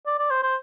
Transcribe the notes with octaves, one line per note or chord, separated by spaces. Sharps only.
D5
D5
C5
C5